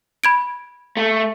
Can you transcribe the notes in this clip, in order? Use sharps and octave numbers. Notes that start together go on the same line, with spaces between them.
B5 G#6 D7
A3